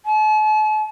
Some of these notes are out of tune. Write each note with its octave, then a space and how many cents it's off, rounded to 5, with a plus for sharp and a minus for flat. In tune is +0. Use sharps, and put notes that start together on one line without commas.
A5 -45